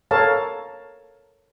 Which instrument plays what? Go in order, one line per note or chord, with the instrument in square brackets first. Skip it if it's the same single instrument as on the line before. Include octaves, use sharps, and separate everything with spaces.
[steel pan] A4 A#4 C#5 F5 A5